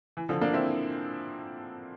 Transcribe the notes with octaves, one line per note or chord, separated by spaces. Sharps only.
E3
D3 F3
A#3 D4
C4 E4